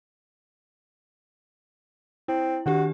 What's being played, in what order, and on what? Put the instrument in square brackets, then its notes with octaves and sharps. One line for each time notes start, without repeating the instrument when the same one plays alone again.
[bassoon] C4 [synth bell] E4
[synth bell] D#3 D4 G4 [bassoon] F#4